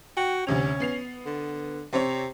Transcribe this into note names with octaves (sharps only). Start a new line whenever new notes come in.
F#4 G5
D2 C3 C#4 F7
B3 C7 F7
D3
C3 C4 C#5